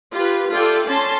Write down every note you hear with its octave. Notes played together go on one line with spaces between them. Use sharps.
F4 G4 B4
F4 A4 D5 E5 G5
C#4 A5 C6